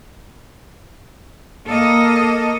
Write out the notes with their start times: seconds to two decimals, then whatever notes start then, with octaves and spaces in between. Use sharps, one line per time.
1.67 A#3 A4 D#5